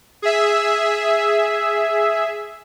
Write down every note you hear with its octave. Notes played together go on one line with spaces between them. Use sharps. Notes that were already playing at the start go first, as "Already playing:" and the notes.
G#4 E5